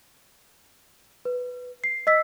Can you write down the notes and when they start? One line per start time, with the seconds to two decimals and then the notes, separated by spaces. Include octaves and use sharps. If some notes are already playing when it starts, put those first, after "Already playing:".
1.25 B4
1.84 C7
2.07 D#5 E6 B6